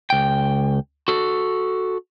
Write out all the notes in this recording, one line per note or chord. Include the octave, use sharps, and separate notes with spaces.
C#2 G5
F#4 A4